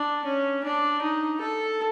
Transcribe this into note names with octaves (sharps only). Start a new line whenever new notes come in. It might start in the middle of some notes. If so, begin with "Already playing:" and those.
Already playing: D4
C#4
D4
D#4
A4